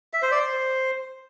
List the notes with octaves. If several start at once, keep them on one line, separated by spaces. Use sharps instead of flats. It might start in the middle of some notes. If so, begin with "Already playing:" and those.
E5
C5
D5
C5